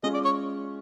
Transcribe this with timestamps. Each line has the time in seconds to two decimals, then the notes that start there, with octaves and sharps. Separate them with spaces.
0.03 G#3 C#4 F4 G#4 D#5
0.14 D5
0.25 C#5